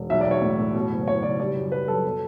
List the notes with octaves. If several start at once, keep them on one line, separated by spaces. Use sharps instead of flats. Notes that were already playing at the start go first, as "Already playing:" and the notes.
Already playing: E1
B1 E5
D5
B1
C#5
A2
A2
B2
F#1
F#1 C#5
F#1 D5
G3 D5
F#2
G3 B4
F#2 A4
B2